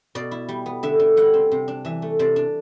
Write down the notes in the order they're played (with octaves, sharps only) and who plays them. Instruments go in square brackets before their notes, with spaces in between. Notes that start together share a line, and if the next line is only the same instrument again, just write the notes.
[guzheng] B2 D5
E4
G3
B3
D3 E5
D3
G3 F#5
C4
C3
D4
E3 E5
A3
C3 D5
D4